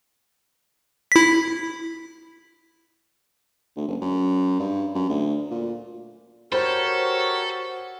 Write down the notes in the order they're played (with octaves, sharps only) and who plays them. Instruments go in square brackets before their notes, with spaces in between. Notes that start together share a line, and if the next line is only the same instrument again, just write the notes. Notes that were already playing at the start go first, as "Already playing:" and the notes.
[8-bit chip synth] E4 B6
[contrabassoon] D2
F#1
F#2
G2
F#2
D2
A#2
[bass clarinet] F#4 [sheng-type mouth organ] G4 A#4 C#5 [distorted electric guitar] A4 [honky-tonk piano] C5